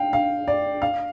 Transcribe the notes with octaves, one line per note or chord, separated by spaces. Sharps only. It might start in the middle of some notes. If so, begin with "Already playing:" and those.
Already playing: F5 G5
F5
D5
F5